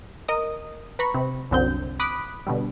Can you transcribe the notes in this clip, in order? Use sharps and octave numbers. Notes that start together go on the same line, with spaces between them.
A#4 D#5 D#6
B4 A#5 B5 C#6
C3
C2 F#2 D3 F#3 C4 G6
B5 D6 D#6 F#6 B6
B2 D3 G3